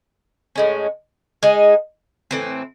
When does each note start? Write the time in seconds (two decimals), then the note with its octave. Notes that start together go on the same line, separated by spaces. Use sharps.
0.56 A2 G#3 C#4
1.43 G#3 D#4 G#4
2.31 A2 E3 C4